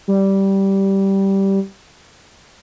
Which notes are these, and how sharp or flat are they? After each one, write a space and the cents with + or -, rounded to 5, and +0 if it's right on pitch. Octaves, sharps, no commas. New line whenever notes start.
G3 -10